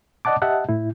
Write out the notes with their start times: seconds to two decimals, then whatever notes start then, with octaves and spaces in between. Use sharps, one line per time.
0.25 D5 D#5 F#5 A5 D6
0.42 G4 D#5 E5 F#5 A5
0.69 A2 E4